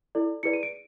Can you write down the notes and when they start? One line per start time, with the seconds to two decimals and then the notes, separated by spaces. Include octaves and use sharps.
0.15 E4 A4 D5
0.43 E4 G#4 B4 D5 C#7
0.53 D#7
0.63 D7